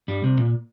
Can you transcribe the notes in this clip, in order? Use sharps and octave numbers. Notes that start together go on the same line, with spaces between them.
G2 G3
C2 C3
A#2